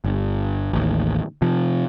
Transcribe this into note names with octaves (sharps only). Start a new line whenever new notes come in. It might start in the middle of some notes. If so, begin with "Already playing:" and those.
G1
A1 D#2
C3 F3